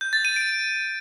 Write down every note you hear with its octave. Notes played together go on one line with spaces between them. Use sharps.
G6
A6
D#7
D7